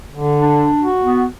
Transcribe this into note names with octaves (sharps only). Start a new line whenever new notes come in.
D3
D4
F#4
B3